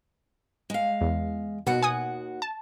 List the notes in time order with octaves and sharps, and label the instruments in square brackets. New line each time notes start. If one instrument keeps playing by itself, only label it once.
[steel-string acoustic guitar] G#3 F5
[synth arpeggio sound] E2
[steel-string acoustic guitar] D#2 F#4 F#5 [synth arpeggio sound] B2
[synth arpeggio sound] G#5 D#6
A5